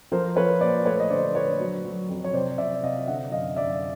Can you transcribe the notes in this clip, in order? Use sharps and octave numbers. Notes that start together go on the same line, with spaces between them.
F3 A#4 C5
F3 B4 C#5
A#2 C5 D5
A3 B4 C#5
D#5
D3 C5 D5
A3 B4 C#5
F#3
F#3
F2
C#5
C3 C5 D5
C3 D5 E5
C3 D#5 F5
D3 E5 F#5
F#2 D#5 F5
F#2 D5 E5